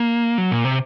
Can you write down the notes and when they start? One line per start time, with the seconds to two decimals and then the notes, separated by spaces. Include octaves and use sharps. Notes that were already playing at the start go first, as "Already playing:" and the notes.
Already playing: A#3
0.38 F#3
0.52 A#2
0.65 C3